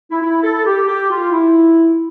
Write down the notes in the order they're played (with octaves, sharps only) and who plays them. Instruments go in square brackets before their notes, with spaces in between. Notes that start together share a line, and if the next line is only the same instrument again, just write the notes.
[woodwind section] E4
E4
A4
G4
G4
F4
E4